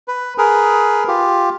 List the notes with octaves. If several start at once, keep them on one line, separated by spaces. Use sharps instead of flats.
B4
G#4 A#4 B4
F4 G4